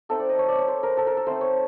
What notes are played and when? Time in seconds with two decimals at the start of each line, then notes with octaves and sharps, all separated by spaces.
0.09 A3 C4 D#4 A4
0.20 D5
0.29 D#5
0.39 C#5
0.48 D5
0.59 C#5
0.68 C5
0.83 A#4
0.97 A4
1.07 A#4
1.17 A4
1.27 A3 C4 D#4 C5
1.41 C#5